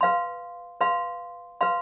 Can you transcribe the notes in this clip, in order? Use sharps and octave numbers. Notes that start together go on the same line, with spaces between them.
B4 F5 C6
B4 F5 C6
B4 F5 C6